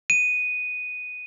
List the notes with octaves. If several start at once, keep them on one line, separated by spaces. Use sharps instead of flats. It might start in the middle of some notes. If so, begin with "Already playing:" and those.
D#7